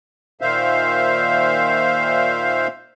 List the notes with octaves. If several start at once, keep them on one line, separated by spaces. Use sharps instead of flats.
A#2 D#3 C5 E5 F5